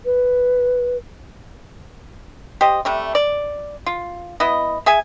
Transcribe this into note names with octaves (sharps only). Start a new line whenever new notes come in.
B4
G4 C5 D#5
C3 G3 A3
D5
F4
B3 E4 D#5
G#4 E5 G#5